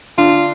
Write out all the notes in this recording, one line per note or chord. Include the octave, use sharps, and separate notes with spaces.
D3 D4 F4